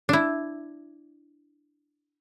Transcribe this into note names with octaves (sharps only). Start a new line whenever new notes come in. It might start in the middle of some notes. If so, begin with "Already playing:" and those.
D4 E4